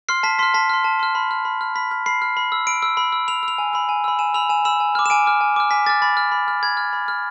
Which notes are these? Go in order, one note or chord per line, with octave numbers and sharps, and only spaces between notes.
C6 F6 C7
A5 B6
C6 F6 B6
A5 B6
C6 F6
A5
C6 F6
B5
F6
B5
F6
B5 B6
F6
B5 C7
F6
B5
E6
B5 D7
E6
B5
E6
B5 F7
E6
F7
G#5
B5 E6
G#5
B5 E6
G#5 E7
B5 E6 F7
G#5 E7
B5 E6 E7
G#5
D6 F6
E7
G#5 D7
D6 F6
G#5
D6 F6
G#5 B6
D6 F6 A6
B5 A6
F6
B5
F6
B5 G#6
F6
B5
F6